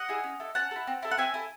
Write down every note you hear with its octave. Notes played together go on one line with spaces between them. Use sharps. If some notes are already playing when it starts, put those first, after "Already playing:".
Already playing: D#5 F#5
E4 G#4
C#4
E4 A4
C#4 F#5 A5
A4
E4
C4
E4 A4
F#5
C4 E5 G#5
E4 A4